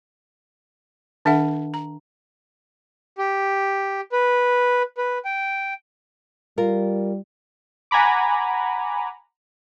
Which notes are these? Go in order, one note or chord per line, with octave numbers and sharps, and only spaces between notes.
D#3 D4 A4 E5 F#5
A#5
G4
B4
B4
G5
G3 F4 A#4
F#5 G#5 A#5 B5 D6